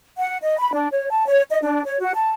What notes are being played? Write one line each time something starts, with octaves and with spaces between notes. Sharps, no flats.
F#5
D#5
B5
D4
C#5
A5
C#5
D#5
D4
C#5
F#4
A5